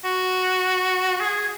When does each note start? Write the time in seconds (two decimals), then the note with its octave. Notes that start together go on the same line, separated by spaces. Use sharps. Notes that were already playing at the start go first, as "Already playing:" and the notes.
0.04 F#4
1.20 G#4